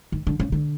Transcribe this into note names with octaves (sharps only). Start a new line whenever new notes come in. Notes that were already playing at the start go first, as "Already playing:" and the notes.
D#3
D3
C#3
D3